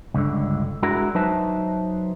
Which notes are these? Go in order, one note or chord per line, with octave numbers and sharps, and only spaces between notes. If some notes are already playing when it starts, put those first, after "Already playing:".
C#2 G2 D3
G#3 D4 E4 F#4 A#4
F#3 D#4 B4 C5 E5 A5